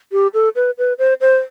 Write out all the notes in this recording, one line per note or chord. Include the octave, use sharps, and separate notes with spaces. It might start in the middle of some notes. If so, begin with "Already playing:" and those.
G4
A4
B4
B4
C5
C5